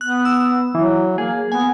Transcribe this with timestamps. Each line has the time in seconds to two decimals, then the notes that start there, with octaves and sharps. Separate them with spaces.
0.01 B3 F#6
0.25 E6
0.75 E3 F#3
1.18 A#3 G#4
1.52 B3 G#5